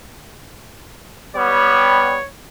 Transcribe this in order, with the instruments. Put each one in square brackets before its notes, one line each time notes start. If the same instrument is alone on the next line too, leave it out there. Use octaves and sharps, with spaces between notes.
[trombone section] G3 B3 [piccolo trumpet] C#5